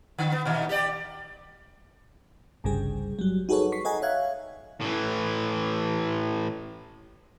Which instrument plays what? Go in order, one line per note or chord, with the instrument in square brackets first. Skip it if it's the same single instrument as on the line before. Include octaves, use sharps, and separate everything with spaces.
[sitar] D3
B3
A#2 D#3
G4 D5
[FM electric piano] G1 C2 G2 C#3 G3 G#4
F#3 G3
D#4 F#4 G#4 A4 B4 C#5
C#6 B6 C7
G#4 A4 D#5 F#5 G#5 A#5
C#5 E5 F5 F#6 G#6
[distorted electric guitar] A2 E3